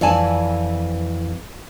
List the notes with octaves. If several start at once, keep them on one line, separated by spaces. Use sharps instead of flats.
F2 E3 D5 G#5 A5